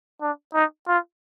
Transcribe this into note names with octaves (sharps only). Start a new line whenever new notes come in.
D4
D#4
F4